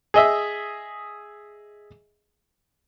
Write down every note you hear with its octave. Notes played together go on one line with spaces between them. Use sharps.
G#4 D#5 E5